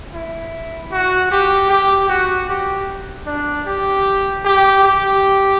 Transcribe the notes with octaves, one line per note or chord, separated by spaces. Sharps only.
E4
F#4
G4
G4
F#4
G4
D4
G4
G4
G4